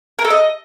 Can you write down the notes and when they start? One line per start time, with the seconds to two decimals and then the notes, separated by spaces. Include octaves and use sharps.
0.19 A#4
0.25 A4
0.30 D#5